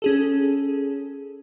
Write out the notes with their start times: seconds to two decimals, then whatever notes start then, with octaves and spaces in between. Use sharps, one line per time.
0.02 C#4 G#4 A4